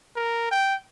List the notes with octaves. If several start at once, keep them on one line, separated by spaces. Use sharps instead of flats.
A#4
G5